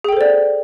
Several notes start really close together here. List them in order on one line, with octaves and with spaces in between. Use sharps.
G#4 G5 A4 C5 D5